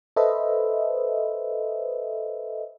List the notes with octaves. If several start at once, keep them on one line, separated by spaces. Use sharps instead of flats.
A4 B4 C5 D#5 E5